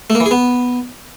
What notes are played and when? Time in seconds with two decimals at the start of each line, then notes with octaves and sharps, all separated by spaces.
0.10 A3
0.15 A#3
0.20 E3
0.26 G#4
0.31 B3